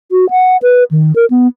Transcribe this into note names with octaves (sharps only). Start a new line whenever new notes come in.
F#4
F#5
B4
D#3
A#4
B3